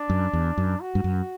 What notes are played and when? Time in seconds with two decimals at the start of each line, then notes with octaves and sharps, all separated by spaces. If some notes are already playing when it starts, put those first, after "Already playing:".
Already playing: D4
0.10 F#2
0.33 E2
0.58 F#2
0.81 F#4
0.95 G2
1.04 F#2